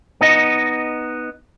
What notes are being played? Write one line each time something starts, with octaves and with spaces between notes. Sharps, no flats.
B3 D#4 D#5